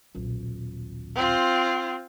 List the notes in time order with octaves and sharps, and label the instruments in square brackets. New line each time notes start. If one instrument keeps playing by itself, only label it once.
[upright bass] D#1 B1
[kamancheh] C4 F4